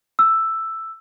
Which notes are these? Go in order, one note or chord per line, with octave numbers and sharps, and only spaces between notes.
E6